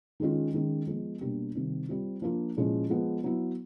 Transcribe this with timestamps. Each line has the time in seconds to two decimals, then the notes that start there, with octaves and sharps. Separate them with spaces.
0.20 D#3 G#3 C#4 F4
0.54 D#3 G#3 C#4
0.87 F3 G#3 B3
1.21 B2 G3 A#3 D4 G4
1.55 C3 D#3 G3
1.89 G3 C4 F4
2.22 F3 A#3 D4 F4
2.57 A#2 F3 G#3 C#4 E4
2.90 F3 G#3 B3
3.24 F#3 B3 E4